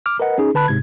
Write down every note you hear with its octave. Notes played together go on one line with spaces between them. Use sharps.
D6 F6
A#4 B4 D#5 F#5
C#4 D#4 G#4
D3 B4 A5 B5 F#6
G#2 C3 G#6